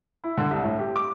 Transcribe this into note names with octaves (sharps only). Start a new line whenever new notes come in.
E4
D3
C2
A2
G4
D6